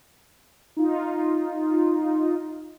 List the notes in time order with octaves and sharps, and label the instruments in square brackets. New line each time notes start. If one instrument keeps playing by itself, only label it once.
[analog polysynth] D#4 F4